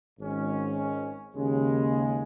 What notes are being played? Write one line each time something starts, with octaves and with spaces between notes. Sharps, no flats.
G#1 G#2 G#3 C#4
D#2 C#3 G#3